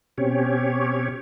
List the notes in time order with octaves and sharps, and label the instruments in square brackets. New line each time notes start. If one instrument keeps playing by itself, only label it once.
[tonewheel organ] B2 C4 C#4 G4 C#5